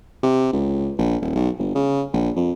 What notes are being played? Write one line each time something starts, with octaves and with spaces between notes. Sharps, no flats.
C3
C#2
A#1
D#1
B1
G1
C#3
A#1
F2